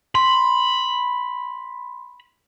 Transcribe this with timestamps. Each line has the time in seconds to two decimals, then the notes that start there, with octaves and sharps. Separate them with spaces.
0.15 B5 C6